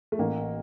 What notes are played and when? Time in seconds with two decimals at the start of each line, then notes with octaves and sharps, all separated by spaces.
0.12 A3
0.19 A1 A#3